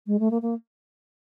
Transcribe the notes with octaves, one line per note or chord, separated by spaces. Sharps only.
G#3
A3
A#3
A#3